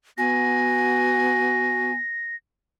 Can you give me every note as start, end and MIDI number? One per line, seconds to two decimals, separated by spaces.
0.18 1.95 59
0.18 1.91 66
0.18 1.93 80
0.18 2.36 94